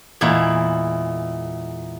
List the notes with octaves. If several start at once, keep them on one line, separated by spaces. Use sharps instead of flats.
E2 A#2 G#3 E4